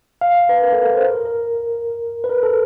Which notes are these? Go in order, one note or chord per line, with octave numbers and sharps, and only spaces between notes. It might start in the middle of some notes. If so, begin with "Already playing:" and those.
F5
F5
B4
A#4
A4
A#4
C5
A#4
A#4
B4
A#4
A4